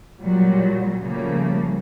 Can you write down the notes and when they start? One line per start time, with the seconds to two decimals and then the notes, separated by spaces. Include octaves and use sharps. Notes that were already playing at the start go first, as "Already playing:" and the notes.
0.20 A#2 F#3 G3
1.01 C#3 F3 G3 A3 A#3